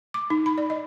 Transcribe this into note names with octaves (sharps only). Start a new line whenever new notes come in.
D6
D#4
B5
D5
D#5